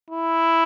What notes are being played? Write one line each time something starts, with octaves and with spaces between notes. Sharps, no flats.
E4